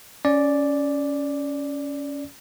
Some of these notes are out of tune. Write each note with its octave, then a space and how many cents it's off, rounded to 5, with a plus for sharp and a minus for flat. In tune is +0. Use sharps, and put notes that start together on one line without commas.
C#4 +15 D5 +0